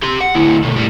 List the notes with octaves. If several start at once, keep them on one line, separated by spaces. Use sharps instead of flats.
G4 C6
F#5
D2 E4
B2 A3
A2 G3